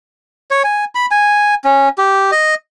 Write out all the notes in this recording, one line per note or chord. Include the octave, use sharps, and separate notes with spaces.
C#5
G#5
B5
G#5
C#4
G4
D#5